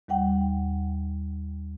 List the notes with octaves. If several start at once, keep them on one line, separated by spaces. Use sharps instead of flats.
D#2 G3 F#5 G5